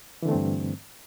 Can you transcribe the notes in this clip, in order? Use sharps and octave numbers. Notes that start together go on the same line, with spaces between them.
G2 D3 E3 A3 C4